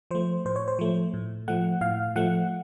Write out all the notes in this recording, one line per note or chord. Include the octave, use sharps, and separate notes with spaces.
F3 A3 C5
A2 C5
C#5
C5
F3 A3
A2
F3 A3 F#5
A2 F5
F3 A3 F#5